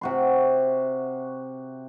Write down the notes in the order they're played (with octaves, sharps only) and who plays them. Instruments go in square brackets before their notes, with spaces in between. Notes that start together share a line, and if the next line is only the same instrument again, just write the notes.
[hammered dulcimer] C3 F#4 C6